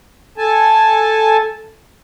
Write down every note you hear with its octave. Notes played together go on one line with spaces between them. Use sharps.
A4 G#5 A5